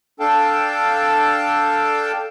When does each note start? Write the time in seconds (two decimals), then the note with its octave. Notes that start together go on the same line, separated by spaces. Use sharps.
0.20 D4 A4 F5 G5 A5